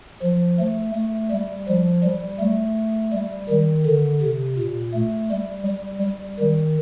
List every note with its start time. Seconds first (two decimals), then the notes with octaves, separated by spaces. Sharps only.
0.22 F3
0.60 A3
0.95 A3
1.31 G3
1.68 F3
2.04 G3
2.40 A3
3.13 G3
3.49 D#3
3.86 D3
4.22 C3
4.58 A#2
4.94 A3
5.31 G3
5.67 G3
6.03 G3
6.40 D#3